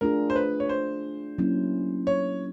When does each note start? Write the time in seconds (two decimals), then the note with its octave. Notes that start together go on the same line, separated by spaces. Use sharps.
0.01 A3 D4 F4 G#4 A#4
0.30 C5
0.36 B4
0.60 C#5
0.69 C5
1.38 F#3 A#3 C#4 E4
2.07 C#5